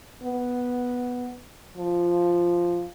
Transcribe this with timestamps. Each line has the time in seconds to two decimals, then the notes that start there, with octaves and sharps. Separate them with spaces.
0.23 B3
1.77 F3